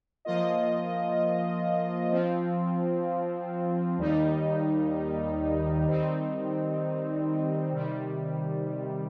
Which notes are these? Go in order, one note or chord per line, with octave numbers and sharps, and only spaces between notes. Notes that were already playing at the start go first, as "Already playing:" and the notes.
F3 A#3 F4 D#5
F3 C4 F4
D#2 D#3 G3 D#4
D#3 G3 C4 D#4
C3 D#3 G3